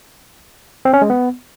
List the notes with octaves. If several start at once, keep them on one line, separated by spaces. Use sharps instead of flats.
C4
C#4
G#3
B3